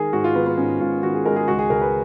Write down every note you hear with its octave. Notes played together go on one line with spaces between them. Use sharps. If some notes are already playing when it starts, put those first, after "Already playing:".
Already playing: D#3 G#3 G#4 A#4
G#2 F#4
F4
D#3 B3
B3
G#2 C#4
G#2 F4
D#3 F#4
G#4
G#3 A#4
G#4
C#2 F#4
G#4
C#2 A#4
B4